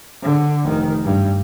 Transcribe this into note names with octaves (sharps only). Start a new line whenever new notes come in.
D3
F1 D#3
G2